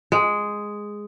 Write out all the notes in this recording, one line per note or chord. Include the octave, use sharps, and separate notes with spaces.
G#3